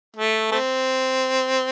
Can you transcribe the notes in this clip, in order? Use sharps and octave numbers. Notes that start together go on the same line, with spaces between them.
A3
A3 C4